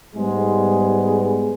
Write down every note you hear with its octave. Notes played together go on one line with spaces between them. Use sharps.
G#2 G3 G#3 B3 G#4